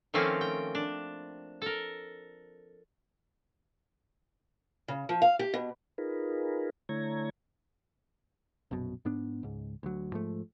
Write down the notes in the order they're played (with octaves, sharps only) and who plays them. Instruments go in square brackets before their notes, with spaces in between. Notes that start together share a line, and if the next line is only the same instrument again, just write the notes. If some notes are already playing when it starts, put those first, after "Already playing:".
[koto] D#3 F3 A3 A#3 C4 C#4
G5
D4
A4 A#4
[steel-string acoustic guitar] C#3
F3
F5
G4
B2
[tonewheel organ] D#4 F4 G#4 A#4 B4
D3 A3 E4 C#5 A#5 G#6
[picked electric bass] A#1 F#2 B2
G#2 B3 D4
C#2 G#2
D2 F#3
G#2 F3 A3